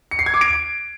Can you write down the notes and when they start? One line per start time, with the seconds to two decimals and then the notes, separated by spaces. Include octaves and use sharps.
0.11 C#7
0.19 C7
0.26 G#6
0.34 D6
0.41 D7